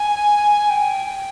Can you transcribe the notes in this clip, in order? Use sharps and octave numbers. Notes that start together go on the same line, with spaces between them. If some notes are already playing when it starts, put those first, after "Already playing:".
Already playing: G#5
G5